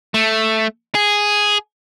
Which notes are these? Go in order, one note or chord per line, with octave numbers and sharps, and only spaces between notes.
A3
G#4